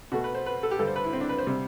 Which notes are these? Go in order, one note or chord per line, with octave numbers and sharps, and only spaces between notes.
B2 A3 F#4
B4
C5
B4
A4
G4
G2 D3 G3 A4
C5
B4
E4
C4
D4
B4
C5
C3 G3